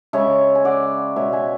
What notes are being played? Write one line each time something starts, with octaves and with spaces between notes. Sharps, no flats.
C#3 G#3 C#5 E5
G#5
D5 F#5
B2 G#3 C#5 E5
E5 G#5